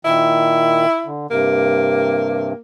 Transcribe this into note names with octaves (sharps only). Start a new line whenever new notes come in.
A#2 D#3 E4
D3
G2 C3 A#3